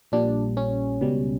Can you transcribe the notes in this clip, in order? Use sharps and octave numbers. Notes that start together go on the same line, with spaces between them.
A#1 A#2 G3 D4
C#4
C#2 B2 G3